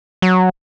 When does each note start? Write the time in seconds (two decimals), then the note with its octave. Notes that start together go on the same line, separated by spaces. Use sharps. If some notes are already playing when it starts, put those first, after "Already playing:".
0.22 F#3